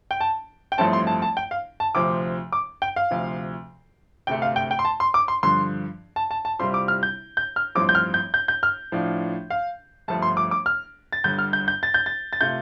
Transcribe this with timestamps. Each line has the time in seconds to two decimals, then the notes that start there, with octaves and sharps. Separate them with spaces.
0.11 G5
0.21 A5
0.72 G5
0.78 A1 G2 F3 A3 C4 A5
0.93 C6
1.07 A5
1.22 A5
1.37 G5
1.51 F5
1.80 A5
1.95 D2 C3 F3 C4 D6
2.52 D6
2.82 G5
2.96 F5
3.11 D2 C3 F3
4.27 D2 C3 A3 G5
4.42 F5
4.56 G5
4.71 G5
4.79 C6
4.85 A5
5.00 C6
5.14 D6
5.28 C6
5.43 G2 D3 F3 C6
6.16 A5
6.31 A5
6.45 A5
6.59 C2 C3 G3 C4 F4 C6
6.74 D6
6.88 F6
7.03 G6
7.37 G6
7.56 F6
7.75 A1 G2 F3 C4 D6
7.89 G6
7.95 F6
8.14 G6
8.34 G6
8.48 G6
8.63 F6
8.92 A2 F3 D4 F4
9.50 F5
10.08 G1 G2 F3 A3 A5
10.22 C6
10.37 D6
10.51 D6
10.66 F6
11.13 A6
11.24 G1 G2 D3 G6
11.38 F6
11.53 G6
11.68 G6
11.83 A6
11.94 G6
12.06 A6
12.33 A6
12.41 C3 A3 F4 G6